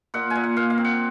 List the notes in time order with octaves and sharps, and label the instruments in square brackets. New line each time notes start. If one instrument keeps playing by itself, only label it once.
[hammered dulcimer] A#2 F#5
G#5
A#2
F#5
A#2 F5
F5
C4
F#5